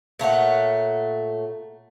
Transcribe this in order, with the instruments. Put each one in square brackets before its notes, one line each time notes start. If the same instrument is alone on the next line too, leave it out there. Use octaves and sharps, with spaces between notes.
[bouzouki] A#2 A3 C#5 F#5